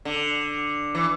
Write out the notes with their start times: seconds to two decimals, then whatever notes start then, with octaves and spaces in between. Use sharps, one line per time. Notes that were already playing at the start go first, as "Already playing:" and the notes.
0.05 D3
0.95 E3